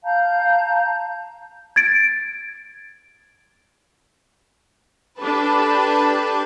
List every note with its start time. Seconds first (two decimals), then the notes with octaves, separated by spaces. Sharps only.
0.03 F5 A5 A#5 G6
1.76 G#6 A6 D7
5.19 D4 G4 A4 B4 A5